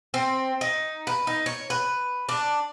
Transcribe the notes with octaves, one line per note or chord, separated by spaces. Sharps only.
C4
D#4
B4
D#4
C#5
B4
D4